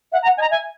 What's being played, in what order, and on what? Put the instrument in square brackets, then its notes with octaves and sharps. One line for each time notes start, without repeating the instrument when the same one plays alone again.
[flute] E5 [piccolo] F#5
[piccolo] A#5
[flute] F#5
[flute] D#5 [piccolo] G#5
[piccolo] A#5
[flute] E5 [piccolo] G#5